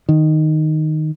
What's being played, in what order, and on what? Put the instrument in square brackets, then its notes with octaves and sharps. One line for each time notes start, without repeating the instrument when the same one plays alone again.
[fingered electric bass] D#3